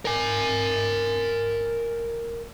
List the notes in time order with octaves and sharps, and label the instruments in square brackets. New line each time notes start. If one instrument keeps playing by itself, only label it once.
[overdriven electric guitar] A#4 G#5